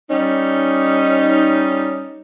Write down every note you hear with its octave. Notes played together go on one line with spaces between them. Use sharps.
G3 C#4 D#4